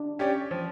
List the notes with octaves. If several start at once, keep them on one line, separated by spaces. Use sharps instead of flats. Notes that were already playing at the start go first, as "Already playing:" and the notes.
Already playing: D4
C#4 G4 D5
F3